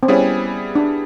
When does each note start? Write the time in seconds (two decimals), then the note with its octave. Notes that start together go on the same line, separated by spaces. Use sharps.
0.03 C4
0.08 G3 B3 C#4 E4 G#4
0.75 D4